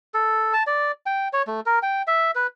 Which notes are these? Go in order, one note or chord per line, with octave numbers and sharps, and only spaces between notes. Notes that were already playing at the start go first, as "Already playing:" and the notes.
A4
A5
D5
G5
C#5
A3
A#4
G5
E5
B4